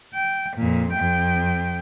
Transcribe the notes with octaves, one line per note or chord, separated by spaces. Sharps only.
G5
F2 A#2
F2 G5